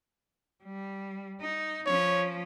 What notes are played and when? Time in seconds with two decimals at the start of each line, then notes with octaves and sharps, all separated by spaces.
0.64 G3
1.41 D#4
1.86 F3 C#4 C#5